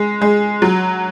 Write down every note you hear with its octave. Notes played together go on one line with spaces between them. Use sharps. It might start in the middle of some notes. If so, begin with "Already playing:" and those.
Already playing: G#3
G#3
F#3